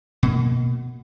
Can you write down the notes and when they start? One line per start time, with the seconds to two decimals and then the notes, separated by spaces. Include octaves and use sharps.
0.23 B2 A#3